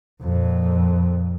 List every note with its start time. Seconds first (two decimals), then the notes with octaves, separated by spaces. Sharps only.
0.22 F2 A#2